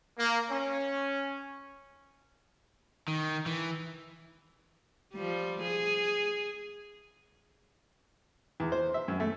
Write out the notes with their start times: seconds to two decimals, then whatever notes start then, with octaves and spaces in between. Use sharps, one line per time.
0.18 A#3
0.50 C#4
3.08 D#3
3.46 E3
5.14 F3 G3
5.61 G#4
8.60 E2
8.72 C5
8.94 E5
9.08 F#2
9.20 A3